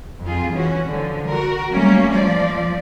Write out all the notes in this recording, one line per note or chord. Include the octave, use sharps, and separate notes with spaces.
F2 F4 G#4
E3 C#4 F#4
D3 F3
F#4 A#4
F#3 G3 A3 A#3 C#4
F3 D5